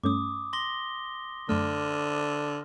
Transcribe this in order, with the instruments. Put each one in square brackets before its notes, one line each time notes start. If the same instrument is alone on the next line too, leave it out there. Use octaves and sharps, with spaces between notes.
[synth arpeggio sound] G2 A3 C#4 [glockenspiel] D6 D#6
[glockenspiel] C6 A#6 G7
[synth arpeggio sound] F#2 A3 [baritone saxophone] D3 [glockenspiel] F6